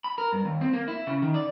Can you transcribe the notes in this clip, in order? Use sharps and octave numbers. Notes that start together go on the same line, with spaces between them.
B5
A#4
G2
D#2
C4
A#3
E4
C#3
D#3
D5